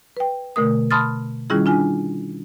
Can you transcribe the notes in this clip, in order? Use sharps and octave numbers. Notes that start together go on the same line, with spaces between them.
B4 G5
B2 D3 A3 A#4 D#6
A5 B5 C6 D#6 F6 A6
D#3 G3 C#4 E4 F4 G#4
D4 F4 G#5